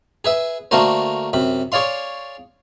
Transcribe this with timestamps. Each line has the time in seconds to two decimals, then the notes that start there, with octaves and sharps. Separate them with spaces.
0.25 G#4 B4 E5
0.71 D3 A3 A#3 F#4 A#4 C5
1.33 F#2 C3 B5
1.72 G#4 C#5 D5 F5 C6